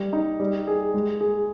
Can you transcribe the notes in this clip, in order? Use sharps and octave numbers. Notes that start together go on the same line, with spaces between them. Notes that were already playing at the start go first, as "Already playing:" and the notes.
Already playing: G3
D#4
G3
G#4
G#3
G#4